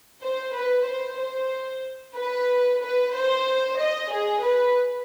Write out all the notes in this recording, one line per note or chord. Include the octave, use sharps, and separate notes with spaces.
C5
B4
C5
C5
B4
B4
C5
D#5
G#4
B4